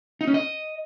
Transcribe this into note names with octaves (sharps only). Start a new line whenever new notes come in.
D#4
C#4
D#5